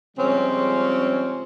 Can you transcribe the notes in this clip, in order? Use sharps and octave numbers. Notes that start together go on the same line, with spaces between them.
C#3 F3 G3 G#3 C4 C#4